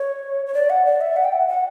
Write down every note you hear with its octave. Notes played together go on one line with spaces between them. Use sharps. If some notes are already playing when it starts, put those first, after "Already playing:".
Already playing: C#5
C#5
D5
F#5
D5
E5
F#5
G5
F#5
F#5